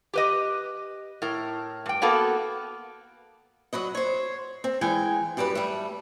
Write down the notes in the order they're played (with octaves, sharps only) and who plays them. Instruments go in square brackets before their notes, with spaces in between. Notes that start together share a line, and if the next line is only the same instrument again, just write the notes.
[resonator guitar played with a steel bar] G4 B4 D#5
A2 A#4
G2 G5
A#3 B3 F#4 A4 A#4
[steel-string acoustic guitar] F#3 F#4 B4 D#5
C5 C#5
C4
E3 G#3 G5 G#5
F#2 G3 G4 A#4 B4
G3 A3